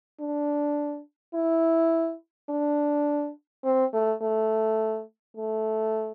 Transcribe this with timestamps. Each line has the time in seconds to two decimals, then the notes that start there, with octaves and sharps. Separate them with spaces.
0.20 D4
1.34 E4
2.50 D4
3.65 C4
3.93 A3
4.22 A3
5.37 A3